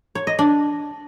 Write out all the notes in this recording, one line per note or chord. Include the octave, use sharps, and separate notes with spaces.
C#5
D#5
D4